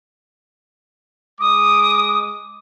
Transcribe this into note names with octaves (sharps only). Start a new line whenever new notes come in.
G#3 D6 D#6